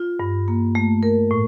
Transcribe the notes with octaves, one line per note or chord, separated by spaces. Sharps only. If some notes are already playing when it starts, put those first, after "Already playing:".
Already playing: F4
G2
A#3
A3
A#4
A2